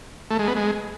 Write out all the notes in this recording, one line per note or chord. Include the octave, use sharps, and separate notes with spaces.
A3
G#3
B3
G#3